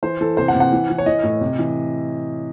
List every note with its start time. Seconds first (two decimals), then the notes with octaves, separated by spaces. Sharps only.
0.03 E3 C5
0.21 E3 A4
0.37 C3 C5
0.48 F#5
0.54 C3
0.60 F#5
0.73 E3
0.90 E3
0.98 C#5
1.06 E3 D#5
1.23 A2
1.41 C3
1.59 E3